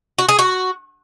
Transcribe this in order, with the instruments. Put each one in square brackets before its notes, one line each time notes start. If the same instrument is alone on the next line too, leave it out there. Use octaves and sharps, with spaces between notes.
[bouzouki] F#4
G#4
F#4